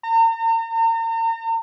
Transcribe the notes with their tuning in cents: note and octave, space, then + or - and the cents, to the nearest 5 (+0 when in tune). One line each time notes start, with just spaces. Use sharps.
A#5 -40